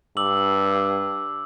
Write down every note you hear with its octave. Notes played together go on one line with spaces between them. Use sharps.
G2 D6 E6 F#7